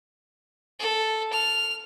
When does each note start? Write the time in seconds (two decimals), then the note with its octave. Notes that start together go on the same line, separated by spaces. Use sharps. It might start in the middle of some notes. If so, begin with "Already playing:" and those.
0.79 A4
1.33 F6